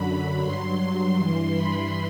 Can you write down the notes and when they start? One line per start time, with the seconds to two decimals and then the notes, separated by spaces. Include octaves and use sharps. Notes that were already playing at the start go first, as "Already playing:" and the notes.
Already playing: F#2 D3 F#3 B5
0.41 G2 F#3 C6
1.15 G2 E3
1.51 B5